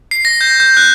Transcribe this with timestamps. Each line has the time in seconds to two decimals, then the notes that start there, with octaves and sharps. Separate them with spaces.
0.11 C7
0.25 A#6
0.41 G6
0.60 G6
0.77 F#6